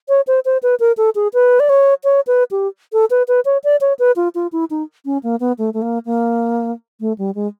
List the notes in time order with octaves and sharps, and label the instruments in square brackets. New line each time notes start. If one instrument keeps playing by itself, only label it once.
[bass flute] C#5
C5
C5
B4
A#4
A4
G#4
B4
D5
C#5
C#5
B4
G4
A4
B4
B4
C#5
D5
C#5
B4
F4
F4
E4
D#4
C#4
A#3
B3
A3
A3
A#3
A#3
A3
G3
G#3